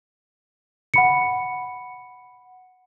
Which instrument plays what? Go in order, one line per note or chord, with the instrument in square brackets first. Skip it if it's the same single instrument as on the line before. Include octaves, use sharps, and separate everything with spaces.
[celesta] F#5 B5 C#7